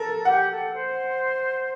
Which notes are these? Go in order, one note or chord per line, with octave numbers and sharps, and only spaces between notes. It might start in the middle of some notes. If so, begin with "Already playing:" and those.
Already playing: A4 A#4
G4 F#5
A4
C5